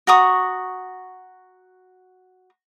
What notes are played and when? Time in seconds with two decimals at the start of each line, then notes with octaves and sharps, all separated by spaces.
0.07 F#4 A#5 C#6 D#6